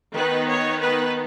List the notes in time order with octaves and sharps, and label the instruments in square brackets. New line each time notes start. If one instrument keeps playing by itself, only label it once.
[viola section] D#3 B3 D#4 B4
C#5
B4